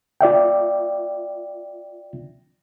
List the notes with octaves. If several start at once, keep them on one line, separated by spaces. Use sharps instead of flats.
F4 D5 E5 G5